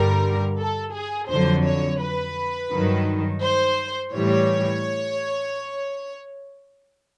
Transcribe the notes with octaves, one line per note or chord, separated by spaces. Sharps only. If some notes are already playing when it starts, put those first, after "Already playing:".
Already playing: G2 D3 G3 A#4
A4
G#4
F2 D3 F#3 C5
C#5
B4
G2 D#3 F#3
C5
A2 E3 G3 C#5